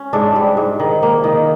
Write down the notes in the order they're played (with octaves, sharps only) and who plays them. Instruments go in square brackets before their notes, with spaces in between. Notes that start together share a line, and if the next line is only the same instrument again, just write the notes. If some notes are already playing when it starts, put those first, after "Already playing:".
Already playing: [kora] C#4
G#2 D4
G3
G#2
D#3
A#3
D#3